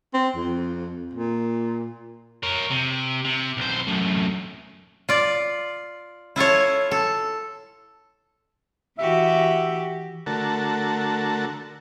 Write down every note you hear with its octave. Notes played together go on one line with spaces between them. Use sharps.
C4
F2
A#2
A#4 C#5
C3
C3
B1 C5
F#2 A2
F4 D5
E4 F4 A4 C#5
A4
E3 F#4 G4 E5
D3 A3 F#4 A#4 A5